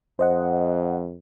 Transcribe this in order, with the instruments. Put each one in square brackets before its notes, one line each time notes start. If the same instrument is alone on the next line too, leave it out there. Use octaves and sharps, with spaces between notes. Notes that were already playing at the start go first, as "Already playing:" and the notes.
[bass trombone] F2 [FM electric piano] C5 D#5 F#5